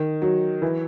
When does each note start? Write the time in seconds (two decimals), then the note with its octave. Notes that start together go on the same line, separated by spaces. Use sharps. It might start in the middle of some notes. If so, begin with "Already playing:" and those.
Already playing: D#3
0.22 F#3
0.62 E3